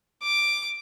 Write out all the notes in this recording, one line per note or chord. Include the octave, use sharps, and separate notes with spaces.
D6